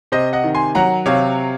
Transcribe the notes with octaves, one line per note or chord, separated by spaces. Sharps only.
C3 C5 D#5
D#5 F#5
D#3
G#5 C6
F#3 F#5 A#5
C3 C#5 F5